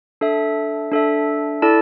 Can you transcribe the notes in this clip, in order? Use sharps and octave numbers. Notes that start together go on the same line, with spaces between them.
D4 A4 E5
D4 A4 E5
E4 A4 D5 A5